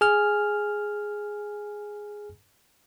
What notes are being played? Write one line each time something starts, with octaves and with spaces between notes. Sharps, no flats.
G#4 G#5 F6